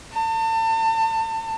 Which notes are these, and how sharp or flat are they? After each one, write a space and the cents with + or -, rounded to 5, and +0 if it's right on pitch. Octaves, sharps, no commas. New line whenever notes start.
A5 +35